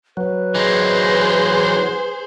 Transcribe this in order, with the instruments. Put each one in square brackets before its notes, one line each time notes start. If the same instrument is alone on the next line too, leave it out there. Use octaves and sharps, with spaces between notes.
[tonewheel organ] F#3 [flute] B4
[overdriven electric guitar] E3 D#4 [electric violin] G#4 C5